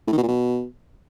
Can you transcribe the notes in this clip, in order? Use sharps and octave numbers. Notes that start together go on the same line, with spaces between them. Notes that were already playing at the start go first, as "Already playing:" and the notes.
A2
D#3
B2
A#2
B2